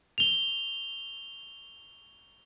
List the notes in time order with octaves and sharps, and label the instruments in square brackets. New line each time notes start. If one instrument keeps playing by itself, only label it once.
[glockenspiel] F7 G7